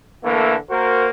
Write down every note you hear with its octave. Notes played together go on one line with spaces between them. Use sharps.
D3 E3 A3 A#3
A#3 F#4 A#4 C5